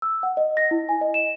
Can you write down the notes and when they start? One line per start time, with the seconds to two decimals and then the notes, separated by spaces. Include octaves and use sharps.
0.02 E6
0.23 F#5
0.37 D#5
0.57 A#6
0.71 E4
0.89 G#5
1.01 D#5
1.14 E7